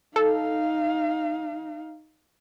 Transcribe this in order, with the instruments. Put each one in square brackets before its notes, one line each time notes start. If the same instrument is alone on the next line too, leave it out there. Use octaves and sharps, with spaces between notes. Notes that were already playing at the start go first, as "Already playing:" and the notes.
[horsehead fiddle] D#4 F5 [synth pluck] A4